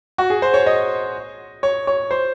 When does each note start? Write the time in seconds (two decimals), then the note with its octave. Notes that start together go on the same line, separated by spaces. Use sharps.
0.18 F#4
0.30 G#4
0.42 C5
0.54 C#5
0.67 D#5
1.63 C#5
1.87 C#5
2.11 C5